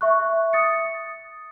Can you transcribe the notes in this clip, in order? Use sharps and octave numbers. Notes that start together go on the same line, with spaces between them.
E5 C#6 F#6
D#6 A6 C#7